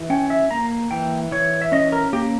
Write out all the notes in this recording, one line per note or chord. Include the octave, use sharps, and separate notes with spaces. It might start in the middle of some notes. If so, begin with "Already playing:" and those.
Already playing: E3
C#4 G5
E5
A#3 A#5
E3 G5
E3 C#5
E5
C#4 D#5
A#4
A#3 G4